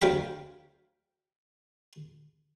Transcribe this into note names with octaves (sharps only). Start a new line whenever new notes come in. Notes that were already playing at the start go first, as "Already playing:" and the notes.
D2 F#3 F5 G5 B5